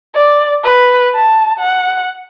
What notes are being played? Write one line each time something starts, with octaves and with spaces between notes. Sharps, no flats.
D5
B4
A5
F#5